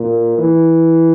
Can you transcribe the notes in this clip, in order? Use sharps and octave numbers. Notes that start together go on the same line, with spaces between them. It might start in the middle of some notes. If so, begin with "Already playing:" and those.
Already playing: A#2
E3